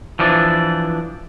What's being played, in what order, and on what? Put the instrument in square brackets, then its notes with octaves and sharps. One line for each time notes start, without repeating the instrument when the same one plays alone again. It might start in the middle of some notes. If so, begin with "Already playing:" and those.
[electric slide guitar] E3 F3 D4